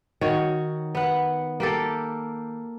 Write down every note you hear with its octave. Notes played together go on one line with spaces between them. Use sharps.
D#3 F#4 C#5
B3 F#5
A#3 G4 A4